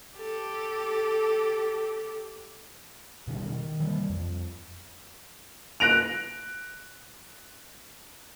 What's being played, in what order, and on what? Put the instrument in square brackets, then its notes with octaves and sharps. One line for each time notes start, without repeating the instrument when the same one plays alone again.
[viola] G4 A4
[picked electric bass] B2 D#3 G3
D#3
E3 G3 A3 A#3
F2
[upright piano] F#6 A#6 D7 F7